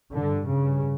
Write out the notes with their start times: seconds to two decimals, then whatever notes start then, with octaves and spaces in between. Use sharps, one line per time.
0.13 G2 D3
0.48 C#3